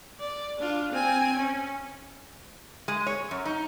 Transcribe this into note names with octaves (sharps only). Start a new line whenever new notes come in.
D5
D4 F4
C4 G#5
C#4
G#3
C#5
F#2
D#4